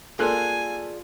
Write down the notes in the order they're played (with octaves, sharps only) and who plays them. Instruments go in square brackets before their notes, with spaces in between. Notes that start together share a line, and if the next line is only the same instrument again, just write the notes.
[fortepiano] A#3 A4 F#6 [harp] F4 [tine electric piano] G#4 D5 [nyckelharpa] G#5